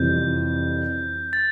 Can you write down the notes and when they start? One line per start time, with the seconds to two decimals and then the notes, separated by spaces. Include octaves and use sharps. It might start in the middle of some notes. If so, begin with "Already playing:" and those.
Already playing: F2 C3 E3 G3 G6
1.33 A6